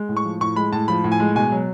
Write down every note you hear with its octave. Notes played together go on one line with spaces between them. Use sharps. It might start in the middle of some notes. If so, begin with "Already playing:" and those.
Already playing: G#3
A2
C#6
F3
A2 C#6
G#3 B5
A2 A5
F3 B5
A2
G#5
G#3
B2 G#5
F#3